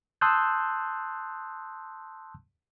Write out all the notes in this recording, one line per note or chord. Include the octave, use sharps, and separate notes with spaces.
A5 C6 D#6 E6 F#6 G6